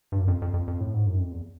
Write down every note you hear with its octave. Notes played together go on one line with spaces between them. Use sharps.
G2
F#2
F2
F2
F2
F2
A2
G#2
F#2
F2
E2